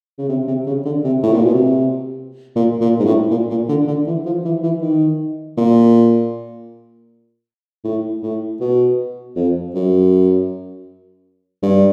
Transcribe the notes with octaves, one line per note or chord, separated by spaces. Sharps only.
C#3
C3
C3
C#3
D3
C3
A2
A#2
B2
C3
A#2
A#2
G#2
A2
A#2
A#2
D3
D3
E3
F3
E3
E3
D#3
A#2
A2
A2
B2
F2
F#2
G2